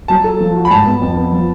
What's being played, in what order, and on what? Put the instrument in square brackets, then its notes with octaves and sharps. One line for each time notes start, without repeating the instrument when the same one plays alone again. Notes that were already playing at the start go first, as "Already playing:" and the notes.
[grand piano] F#3 [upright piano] A5
[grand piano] A4
F3
F#4
[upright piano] B5
[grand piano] G#2 [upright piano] A5
[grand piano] B3
F2
B3
F3